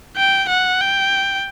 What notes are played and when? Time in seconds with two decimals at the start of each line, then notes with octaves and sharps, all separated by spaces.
0.17 G5
0.49 F#5
0.81 G5